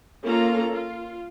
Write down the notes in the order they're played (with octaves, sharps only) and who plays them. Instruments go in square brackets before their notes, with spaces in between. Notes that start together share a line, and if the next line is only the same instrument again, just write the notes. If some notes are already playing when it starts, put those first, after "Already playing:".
[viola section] A#3 C#4 F4 A4 A#5
F4